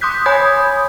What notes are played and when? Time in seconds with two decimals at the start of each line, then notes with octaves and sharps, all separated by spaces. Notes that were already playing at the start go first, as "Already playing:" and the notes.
0.01 C6 D6 D#6 F#6 G6 B6
0.26 C#5 G#5 B5 D#6 G6 G#6